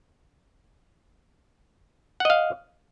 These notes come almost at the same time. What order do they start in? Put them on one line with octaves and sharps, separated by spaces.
F#5 D#5 F5